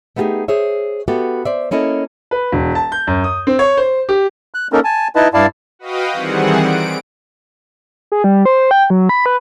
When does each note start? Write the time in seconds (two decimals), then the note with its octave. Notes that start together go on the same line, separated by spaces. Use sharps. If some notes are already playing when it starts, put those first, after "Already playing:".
0.16 A3 B3 D#4 F4 G4 G#4
0.48 G#4 C5 C#5 E5
1.08 B3 F#4 G4 A4 E5
1.45 C5 D5 E5
1.71 A#3 C#4 E4 A4 D#5
2.31 B4
2.52 E1
2.75 A5
2.92 G6
3.07 F#2
3.24 D#6
3.47 C4
3.59 C#5
3.77 C5
4.09 G4
4.54 F#6
4.72 A#3 C#4 D#4 A4 A#4
4.84 G#5 A5
5.16 D#4 E4 B4 D#5 A5
5.34 G2 E4 D5 F5 A5
5.79 F#4 B4 D#5 F5 G5 D#6
6.13 D#3 E3 G3 C4 G#4 F#5
6.59 D7
8.12 G#4
8.24 G3
8.45 C5
8.71 G5
8.90 F#3
9.09 B5
9.26 B4